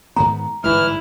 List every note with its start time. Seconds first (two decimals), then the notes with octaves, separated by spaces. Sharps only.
0.16 G#2 D#3 B3 A#5
0.64 G1 G#2 E3 G#3 E4 F6